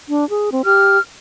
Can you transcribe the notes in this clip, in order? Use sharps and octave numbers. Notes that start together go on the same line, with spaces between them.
D4
G#4
C4
G4 F6